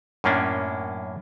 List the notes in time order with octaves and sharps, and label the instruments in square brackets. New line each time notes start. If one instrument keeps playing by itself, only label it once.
[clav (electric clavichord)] F#2 A2 A#3 C#4 D4